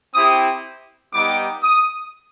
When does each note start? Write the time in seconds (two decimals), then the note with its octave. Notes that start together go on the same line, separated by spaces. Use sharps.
0.15 C4 E4 G4 D#6
1.13 G3 B3 D#4 G4 D6
1.63 D#6